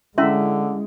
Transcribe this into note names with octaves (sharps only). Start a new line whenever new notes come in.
D3 G#3 C#4 E4 E5 C6